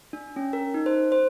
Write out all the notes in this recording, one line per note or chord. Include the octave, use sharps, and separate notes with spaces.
D4
C#4
A#4
D#4
C5
C5